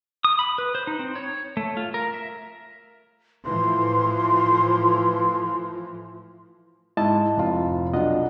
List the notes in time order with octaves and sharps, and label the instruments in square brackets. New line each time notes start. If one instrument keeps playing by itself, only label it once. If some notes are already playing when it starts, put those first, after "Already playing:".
[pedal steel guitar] D#6
B5
B4
C5
D#4
C4
C#5
A3
F4
A#4
E5
[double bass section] A2 E3 F3 [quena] C6
[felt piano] G#2 [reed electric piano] E4 D#5 A5
[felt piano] F1 F4
[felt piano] B1 D4 [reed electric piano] F4 D#5 F#5